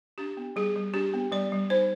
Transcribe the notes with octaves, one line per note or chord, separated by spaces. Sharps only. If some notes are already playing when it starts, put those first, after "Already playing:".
D4 G4
B3
G3 G#4
G3
D4 G4
B3
G3 D5
G3
D#4 C5